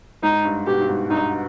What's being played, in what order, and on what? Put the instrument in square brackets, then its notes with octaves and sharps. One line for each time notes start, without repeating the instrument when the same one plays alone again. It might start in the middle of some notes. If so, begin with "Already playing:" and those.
[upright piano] G#2 [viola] D#4
[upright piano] G2
[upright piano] B2 [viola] G4
[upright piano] G2
G#2
[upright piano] G2 [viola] D#4